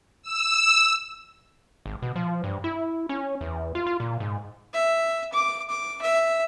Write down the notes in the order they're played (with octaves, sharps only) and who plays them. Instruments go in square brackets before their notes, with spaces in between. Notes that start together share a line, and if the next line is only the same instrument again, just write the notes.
[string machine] E6
[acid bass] G#1
B2
F3
G2
E4
C#4
E2
F4
F4
A#2
G#2
[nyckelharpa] E5
D6
D6
E5